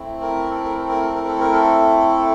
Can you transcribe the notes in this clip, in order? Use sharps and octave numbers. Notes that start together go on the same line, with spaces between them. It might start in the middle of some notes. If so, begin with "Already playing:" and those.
Already playing: A3 C4 E4
A#4
A4
A#4
A4
A#4
A4
A#4
A4
A#4
A4